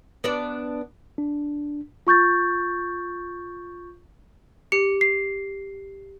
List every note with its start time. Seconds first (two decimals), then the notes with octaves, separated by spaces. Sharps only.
0.24 B3 D4 D5
1.18 D4
2.07 F4 C#6 G6 A6
4.72 G4 C#7
5.01 C7